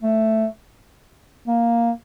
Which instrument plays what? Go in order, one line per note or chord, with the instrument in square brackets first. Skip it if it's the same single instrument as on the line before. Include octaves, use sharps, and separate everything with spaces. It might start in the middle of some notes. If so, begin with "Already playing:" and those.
[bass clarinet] A3
A#3